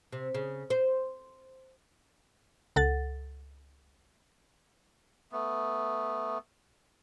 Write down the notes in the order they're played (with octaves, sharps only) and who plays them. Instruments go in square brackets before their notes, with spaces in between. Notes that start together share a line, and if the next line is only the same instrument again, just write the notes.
[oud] C3
C#3
C5
[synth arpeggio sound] C#2 A4 F#5 A6
[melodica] A3 B3